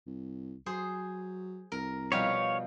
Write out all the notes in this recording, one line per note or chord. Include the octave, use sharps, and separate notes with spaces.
C2
F#3 G#4 C5
C2 A#4
B2 F3 G3 C#5 F5